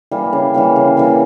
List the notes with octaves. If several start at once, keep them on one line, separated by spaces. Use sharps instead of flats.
E3 G3 A#3
C#3
E3 G3 A#3
C#3
E3 G3 A#3